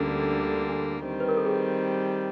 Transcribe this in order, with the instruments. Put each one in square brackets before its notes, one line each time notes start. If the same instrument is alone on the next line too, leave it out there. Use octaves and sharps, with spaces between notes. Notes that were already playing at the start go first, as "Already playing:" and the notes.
Already playing: [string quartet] D2 D3 G3 A#3 [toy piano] C#4
[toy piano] D4
[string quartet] D#3 G3 C4
[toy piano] B4
A#4
A4
G#4